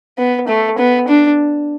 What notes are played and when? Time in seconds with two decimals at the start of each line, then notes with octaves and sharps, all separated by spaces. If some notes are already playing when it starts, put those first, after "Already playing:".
0.18 B3
0.48 A3
0.78 B3
1.08 D4